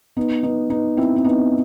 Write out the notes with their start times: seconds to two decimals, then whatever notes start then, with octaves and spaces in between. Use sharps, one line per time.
0.17 B3 D#4
0.43 B3 D#4
0.70 B3 D#4
0.97 C4 E4
1.16 C4
1.24 B3 D#4